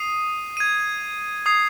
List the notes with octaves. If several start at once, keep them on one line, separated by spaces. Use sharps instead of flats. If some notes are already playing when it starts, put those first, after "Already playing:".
Already playing: D#6 C7 D#7
G#6 D#7
D#6 G#6 C7